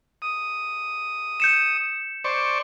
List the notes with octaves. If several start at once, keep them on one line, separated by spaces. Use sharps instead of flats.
D#6
G6 C#7 E7
C5 D5 C#6